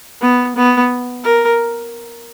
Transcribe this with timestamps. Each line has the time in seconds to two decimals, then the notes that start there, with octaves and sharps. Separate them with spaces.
0.22 B3
0.56 B3
1.24 A#4